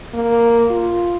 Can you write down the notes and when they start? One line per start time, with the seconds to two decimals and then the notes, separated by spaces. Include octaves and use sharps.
0.14 A#3
0.70 F4